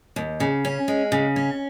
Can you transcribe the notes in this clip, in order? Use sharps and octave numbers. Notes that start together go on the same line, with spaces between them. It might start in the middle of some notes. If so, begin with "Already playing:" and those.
D#2
C#3
C#4
G#3
C#3
C#4